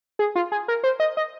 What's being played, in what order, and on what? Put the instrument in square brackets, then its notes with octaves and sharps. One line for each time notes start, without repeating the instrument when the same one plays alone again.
[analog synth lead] G#4
F4
G#4
A#4
C5
D#5
D#5